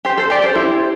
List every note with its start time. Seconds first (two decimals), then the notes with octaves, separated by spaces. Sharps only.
0.05 G4 C5
0.18 A4 C5
0.30 G4 D5
0.44 A4 C5
0.55 E4 G4